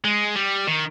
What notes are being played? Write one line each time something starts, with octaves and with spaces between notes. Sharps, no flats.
G#3
G3
D#3